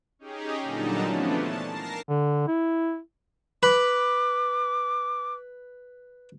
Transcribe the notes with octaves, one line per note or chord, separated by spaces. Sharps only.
C#4 D#4 G4 G#4
A#2 D3 F#3 G3 D#4 A5
E3 F3 A3 B3 C#4 D4
A5
A#4 A5 A#6 C7
D3
E4
B4 D6